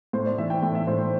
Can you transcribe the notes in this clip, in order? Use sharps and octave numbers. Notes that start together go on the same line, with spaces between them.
A2 C5
D5
E3 E5
G5
A2
E5
A2 C5
C5